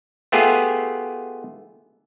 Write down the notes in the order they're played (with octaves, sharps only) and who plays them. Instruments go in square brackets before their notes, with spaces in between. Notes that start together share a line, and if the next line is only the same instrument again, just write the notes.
[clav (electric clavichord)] A3 B3 F4 G4 G#4